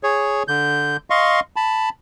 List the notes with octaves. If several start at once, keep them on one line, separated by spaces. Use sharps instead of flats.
G#4 C#5
D3 G6
D#5 F5 C6 C#6
A5 B5